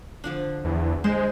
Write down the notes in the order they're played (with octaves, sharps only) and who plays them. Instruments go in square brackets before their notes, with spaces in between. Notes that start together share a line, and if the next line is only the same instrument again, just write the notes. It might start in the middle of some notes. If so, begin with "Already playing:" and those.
[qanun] D3 F3 D4
[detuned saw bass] E2
[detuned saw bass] G#3 [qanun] C5